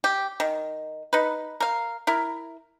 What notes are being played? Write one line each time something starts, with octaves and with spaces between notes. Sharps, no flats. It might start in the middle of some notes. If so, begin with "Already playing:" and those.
G4
D#3
D#4 B4
A#4 F5
E4 A#4